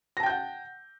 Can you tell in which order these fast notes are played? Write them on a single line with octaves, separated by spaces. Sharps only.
A#6 A5 G5 G6 F#5